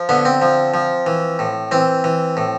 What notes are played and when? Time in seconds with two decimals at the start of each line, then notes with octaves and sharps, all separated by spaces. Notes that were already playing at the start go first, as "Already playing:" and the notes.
Already playing: F3
0.09 D3 B3
0.25 C4
0.42 F3
0.74 F3
1.06 E3
1.39 A2
1.71 E3 C4
2.04 E3
2.37 A2